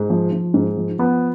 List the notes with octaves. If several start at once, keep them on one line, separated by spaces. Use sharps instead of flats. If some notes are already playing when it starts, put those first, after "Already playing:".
Already playing: G#2
F3
F3
G#2
F3
F3 B3